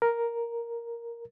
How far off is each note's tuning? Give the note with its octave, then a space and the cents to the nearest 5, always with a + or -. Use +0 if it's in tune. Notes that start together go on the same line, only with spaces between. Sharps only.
A#4 +5